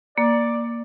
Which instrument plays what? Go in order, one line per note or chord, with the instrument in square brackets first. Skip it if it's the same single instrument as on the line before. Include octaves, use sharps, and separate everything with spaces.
[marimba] A#3 [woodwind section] D5